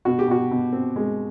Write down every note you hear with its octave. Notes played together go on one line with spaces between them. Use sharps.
B2 F#4
G4
B2 F#4
B2
C4
G#3